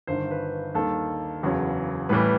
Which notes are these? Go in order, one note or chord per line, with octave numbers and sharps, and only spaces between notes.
G1 G2 D#3 C5
B4
D#2 D#3 G3 A4
F#1 E2 C#3 F#3
A1 A2 E3 G3 B4